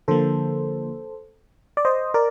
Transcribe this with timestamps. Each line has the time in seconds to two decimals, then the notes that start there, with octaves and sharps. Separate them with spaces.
0.08 D3 F3 A#3 A4 C5
1.77 D5
1.85 C5 D#5
2.14 A#4 D5